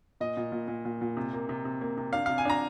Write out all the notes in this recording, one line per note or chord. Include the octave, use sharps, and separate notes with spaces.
A#2 D#5
A#2
A#2
A#2
A#2
A#2
C3
A#3
C3
C3
A#3
C3
D4 F5
C3 F5
G#5
D4 A#5